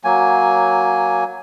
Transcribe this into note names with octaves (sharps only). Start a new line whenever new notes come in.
F#3 A#3 G#5